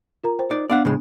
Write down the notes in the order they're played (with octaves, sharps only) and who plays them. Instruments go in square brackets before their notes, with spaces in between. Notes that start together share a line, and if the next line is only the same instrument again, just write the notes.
[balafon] F4 A#4 A#5
C5 G5
[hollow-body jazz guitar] D#4 D5
[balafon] B3 D4 [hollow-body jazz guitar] D5 F5 F#5
[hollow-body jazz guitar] A2 C#3 G#3